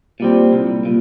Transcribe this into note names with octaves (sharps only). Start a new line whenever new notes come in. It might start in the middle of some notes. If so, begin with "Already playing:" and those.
A#2 G3 C4
C2
A#2